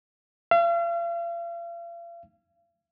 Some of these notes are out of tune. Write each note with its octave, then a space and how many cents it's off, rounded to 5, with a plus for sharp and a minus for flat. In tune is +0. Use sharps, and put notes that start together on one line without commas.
F5 -40